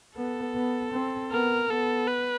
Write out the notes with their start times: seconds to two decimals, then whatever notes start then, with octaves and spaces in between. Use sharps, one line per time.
0.16 B3 A4
0.55 B3
0.93 C4
1.31 B3 A#4
1.69 B3 A4
2.08 B4